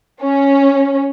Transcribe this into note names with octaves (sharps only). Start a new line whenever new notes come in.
C#4